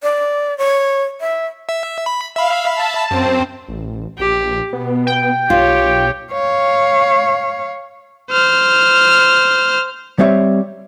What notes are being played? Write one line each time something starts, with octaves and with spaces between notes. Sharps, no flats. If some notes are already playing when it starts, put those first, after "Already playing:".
D5
C#5
E5
E5
B5
E5 F5 B5
A5
F#2 C4 C5
A1
A#1 G4
B2 B3
G5
B1 F4 G4 C#5
C#5 F5
C5 F6
G3 C4 C#5 E5